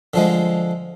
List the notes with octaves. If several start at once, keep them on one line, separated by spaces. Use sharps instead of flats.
D3 F3 G#3